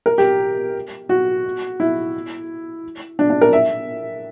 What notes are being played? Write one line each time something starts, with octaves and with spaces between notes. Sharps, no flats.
A#4
G4
F#4
E4
D4
D4
A#4
E5